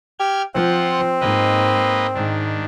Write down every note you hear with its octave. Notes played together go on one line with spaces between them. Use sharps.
G4 G5 F6 G#6
F3 C4 F4 F#5
G#2 A#3 B4 D#5
G#2 D#3 D4